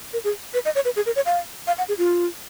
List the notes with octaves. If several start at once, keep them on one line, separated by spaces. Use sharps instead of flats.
A#4
G#4
B4
D#5
C#5
B4
G#4
A#4
C#5
F5
F5
F#5
G#4
F4